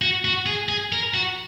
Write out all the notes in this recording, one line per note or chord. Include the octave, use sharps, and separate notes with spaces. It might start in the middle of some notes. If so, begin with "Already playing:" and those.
F#4
F#4
G#4
G#4
A#4
F#4